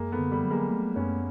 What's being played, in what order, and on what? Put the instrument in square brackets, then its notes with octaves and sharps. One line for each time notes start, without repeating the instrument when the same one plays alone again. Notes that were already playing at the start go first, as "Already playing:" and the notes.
Already playing: [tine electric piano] F#2 [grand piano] G#3 A#3
[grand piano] A3 B3
[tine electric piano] D3
[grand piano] G3 A3
[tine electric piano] F#3
[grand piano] G#3 A#3
[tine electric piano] A3
[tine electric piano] F#2 [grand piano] B3 C#4